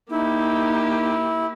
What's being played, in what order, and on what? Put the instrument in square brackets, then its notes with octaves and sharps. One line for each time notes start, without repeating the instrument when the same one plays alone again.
[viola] A#3 G4 [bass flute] D#4 [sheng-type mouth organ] E4